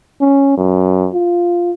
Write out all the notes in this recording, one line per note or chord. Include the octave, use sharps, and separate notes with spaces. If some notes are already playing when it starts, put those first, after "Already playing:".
C#4
F#2
F4